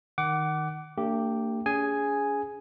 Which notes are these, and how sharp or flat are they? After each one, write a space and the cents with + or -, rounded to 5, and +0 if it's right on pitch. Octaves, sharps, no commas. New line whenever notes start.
D#3 +0 F#5 +25 D6 -10
A#3 -45 D4 +0 G4 +0
C#4 +45 G#4 +0 G#5 +0